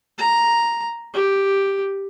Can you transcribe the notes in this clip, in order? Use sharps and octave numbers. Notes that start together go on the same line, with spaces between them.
A#5
G4